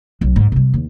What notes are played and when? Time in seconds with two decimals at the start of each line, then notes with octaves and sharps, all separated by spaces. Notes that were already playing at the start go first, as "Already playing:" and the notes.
0.21 B1 F#3
0.36 G#2
0.52 C3 G3
0.74 D#2